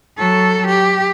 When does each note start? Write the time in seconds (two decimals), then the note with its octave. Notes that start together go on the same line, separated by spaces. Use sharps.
0.18 F#3 A4
0.68 G4